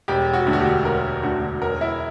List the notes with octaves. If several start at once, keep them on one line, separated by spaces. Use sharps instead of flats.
E1 G4
F#4
D2 D3
F#4
G4
E1 A#4
D2 D3 F#4
E1 A#4
E4